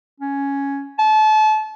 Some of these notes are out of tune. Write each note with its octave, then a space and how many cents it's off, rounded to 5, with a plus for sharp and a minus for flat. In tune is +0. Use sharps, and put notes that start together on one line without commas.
C#4 +5
A5 -30